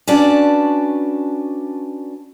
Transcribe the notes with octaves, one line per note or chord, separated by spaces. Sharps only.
C#4 D4 F#4 B4 D5 A5